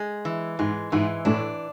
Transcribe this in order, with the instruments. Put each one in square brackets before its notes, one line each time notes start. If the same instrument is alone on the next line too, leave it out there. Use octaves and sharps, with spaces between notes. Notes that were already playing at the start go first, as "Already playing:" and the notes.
Already playing: [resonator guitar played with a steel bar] G#3
E3
[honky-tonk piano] G#2 [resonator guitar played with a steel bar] G#3
[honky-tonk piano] G#2 [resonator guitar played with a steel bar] E3
[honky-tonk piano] A2 [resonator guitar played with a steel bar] D4